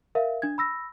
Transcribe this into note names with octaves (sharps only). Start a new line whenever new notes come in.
A#4 E5 F5
D4 G#6
B5 E6 A#6